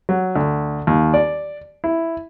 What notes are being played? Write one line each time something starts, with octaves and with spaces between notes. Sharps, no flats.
F#3
D2
D#2
D5
E4